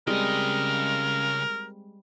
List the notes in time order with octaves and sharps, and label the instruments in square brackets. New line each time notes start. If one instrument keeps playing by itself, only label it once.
[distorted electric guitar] C#3 D#5 [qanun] G3 G#3 C4 [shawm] A#4